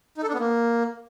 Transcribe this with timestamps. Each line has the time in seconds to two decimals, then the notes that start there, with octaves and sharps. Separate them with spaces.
0.18 D#4
0.23 A4
0.29 D4
0.34 B3
0.39 A#3